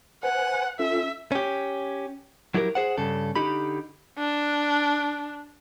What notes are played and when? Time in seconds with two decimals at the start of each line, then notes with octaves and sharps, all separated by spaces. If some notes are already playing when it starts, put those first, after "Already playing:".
0.23 B4 C5 F#5 G#5
0.79 C#4 F4 A4 E5
1.32 C#4 G4
2.54 F#3 E4 G4 G#4 A#4
2.75 G#4 C5 F#5
2.98 G2 C#3 A4
3.36 D3 D#4 G4 B5
4.18 D4